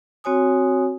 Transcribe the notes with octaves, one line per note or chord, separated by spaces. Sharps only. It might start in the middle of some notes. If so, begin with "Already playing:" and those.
C4 F#4 C#5 G#5 D#6